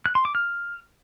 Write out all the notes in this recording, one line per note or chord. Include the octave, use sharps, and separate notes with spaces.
F#6
C6
D6
F6